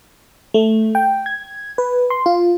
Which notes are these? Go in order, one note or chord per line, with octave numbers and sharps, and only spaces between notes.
A3
G5
G#6
B4
C6
F4